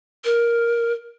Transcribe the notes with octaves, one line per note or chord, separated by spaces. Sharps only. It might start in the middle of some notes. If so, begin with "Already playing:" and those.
A#4